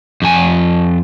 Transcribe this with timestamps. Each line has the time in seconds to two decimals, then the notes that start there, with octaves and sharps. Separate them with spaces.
0.22 F2 G#5